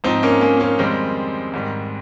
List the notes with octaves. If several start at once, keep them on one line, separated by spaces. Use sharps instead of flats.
G#2 F3 C4 D#4
A#3 C#4
A#3 C#4
A#3 C#4
F2 D#3 G3 G#3 C4
G#2 D#3 G3